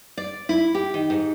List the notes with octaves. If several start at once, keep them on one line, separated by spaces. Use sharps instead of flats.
D5
E4
G4
D#3
G#2